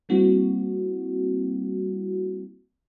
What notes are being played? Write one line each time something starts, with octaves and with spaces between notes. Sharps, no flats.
G3 A#3 C4 E4 F#4